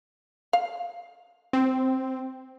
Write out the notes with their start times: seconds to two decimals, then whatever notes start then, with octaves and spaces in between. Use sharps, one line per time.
0.53 F5
1.53 C4